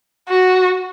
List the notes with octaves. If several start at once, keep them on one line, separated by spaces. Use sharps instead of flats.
F#4